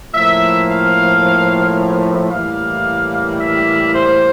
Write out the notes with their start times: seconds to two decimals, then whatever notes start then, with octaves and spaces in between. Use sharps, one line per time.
0.14 A2 F3 A#3 E5
0.68 F5
1.77 E5
2.30 A2 E3 G3 A#3 F5
3.39 E5
3.92 C5